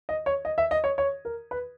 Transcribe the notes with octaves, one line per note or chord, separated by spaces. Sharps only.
D#5
C#5
D#5
E5
D#5
C#5
C#5
A#4
B4